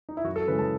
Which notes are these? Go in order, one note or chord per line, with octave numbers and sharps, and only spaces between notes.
D#4
E4
F#2 F#4
A4
C#3 E3 G#3 B4
A5